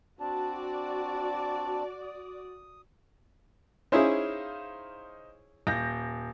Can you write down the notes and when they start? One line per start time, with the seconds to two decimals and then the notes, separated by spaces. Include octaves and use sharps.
0.20 C4 D4 F#4 D5 A5
2.02 D#6
3.92 C#4 D#4 E4 G#4 C5 F5
5.67 D#1 G6 A#6